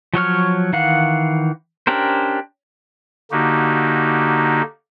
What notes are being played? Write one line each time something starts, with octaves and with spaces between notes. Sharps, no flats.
F3 F#3 C#5 F6
D#3 E3 F5 F#5
C#4 D4 G4 A#4 C5
D3 A#3 D#4 F#4 G4